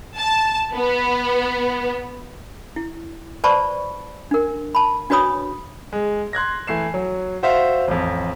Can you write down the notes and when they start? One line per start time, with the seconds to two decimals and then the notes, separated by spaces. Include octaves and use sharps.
0.16 A5
0.73 B3
2.76 E4
3.44 B4 C5 D5 A5 B5 C#6
4.31 D4 A#4
4.75 A5 B5
5.10 D4 F#4 B4 C#5 B5 D#6
5.93 G#3
6.33 C6 F#6 G#6 A#6
6.67 E3 A3 C7 E7
6.94 F#3
7.43 F#4 C5 E5 F5
7.88 A1 F2